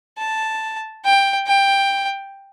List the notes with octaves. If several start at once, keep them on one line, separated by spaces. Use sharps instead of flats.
A5
G5
G5